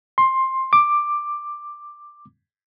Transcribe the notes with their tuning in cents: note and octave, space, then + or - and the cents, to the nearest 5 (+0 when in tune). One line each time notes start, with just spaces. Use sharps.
C6 +15
D6 +10